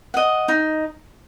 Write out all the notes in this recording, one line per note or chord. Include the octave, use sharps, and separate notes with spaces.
D#5 F#5
D#4